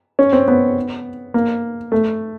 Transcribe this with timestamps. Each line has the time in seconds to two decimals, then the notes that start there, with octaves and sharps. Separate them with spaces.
0.19 C#4
0.33 C4
0.48 B3
1.34 A#3
1.92 A3